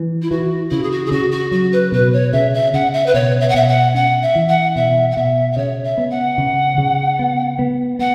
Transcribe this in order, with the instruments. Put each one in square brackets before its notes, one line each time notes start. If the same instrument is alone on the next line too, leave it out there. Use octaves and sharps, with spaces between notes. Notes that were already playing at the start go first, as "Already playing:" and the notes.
Already playing: [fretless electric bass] E3
[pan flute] E4
[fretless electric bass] E3 [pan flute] F#4
[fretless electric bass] C#3 [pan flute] E4
[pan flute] G#4
F#4
G#4
[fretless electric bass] C#3 [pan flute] F#4
[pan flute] F#4
[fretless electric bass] F#3 [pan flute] F#4
[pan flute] B4
[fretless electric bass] B2 [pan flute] B4
[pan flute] C#5
[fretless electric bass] C#3 [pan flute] E5
[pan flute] E5
[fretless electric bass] C#3 [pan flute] F#5
[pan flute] E5
B4
[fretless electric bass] B2 [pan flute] C#5
[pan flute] E5
F#5
[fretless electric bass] B2 [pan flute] E5
[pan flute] F#5
[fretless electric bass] C#4 [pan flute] F#5
[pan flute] E5
[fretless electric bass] E3
[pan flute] F#5
[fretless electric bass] B2 [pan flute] E5
[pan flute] F#5
[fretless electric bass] B2 [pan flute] E5
[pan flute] E5
[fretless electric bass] C#3 [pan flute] C#5
[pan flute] E5
[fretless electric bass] B3
[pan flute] F#5
[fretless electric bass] C#3
C#3
B3
B3
[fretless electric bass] B3 [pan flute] F#5